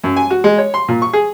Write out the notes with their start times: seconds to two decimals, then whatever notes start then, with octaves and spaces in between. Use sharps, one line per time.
0.04 F#2
0.17 G#5
0.30 F#4
0.44 G#3
0.58 C#5
0.74 C6
0.88 A#2
1.02 C#6
1.13 G#4